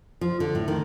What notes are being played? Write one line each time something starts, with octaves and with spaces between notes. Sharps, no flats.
F3
D3
A2
D#3